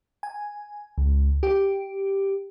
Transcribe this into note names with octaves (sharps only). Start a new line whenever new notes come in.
G#5
C#2
G4